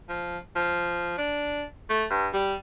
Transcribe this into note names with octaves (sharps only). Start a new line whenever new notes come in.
F3
F3
D4
A3
G2
G3